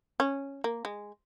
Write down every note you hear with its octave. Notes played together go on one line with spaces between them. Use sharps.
C#4
A#3
G#3